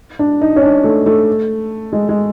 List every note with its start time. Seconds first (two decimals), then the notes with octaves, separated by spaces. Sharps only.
0.19 D4
0.41 D#4
0.56 C#4
0.63 D4
0.84 A3
1.06 A3
1.93 G#3
2.09 G#3